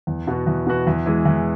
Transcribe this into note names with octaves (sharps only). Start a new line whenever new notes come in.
E2
B2 B3 F#4
E2
B2 B3 F#4
E2
E3 G#3
E2